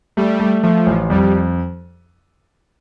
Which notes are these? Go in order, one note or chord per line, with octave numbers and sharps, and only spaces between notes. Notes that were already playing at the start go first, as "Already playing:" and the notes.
G3 A3
A3
F3 A3
A1
F2 G3